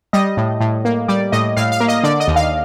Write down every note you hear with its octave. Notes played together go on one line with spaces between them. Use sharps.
G3 D#5
A2
A2
A#3
G3 D5
A2 D#5
A2 F5
F5
A#3
D#5
D3 D5
D#5
D#2
F5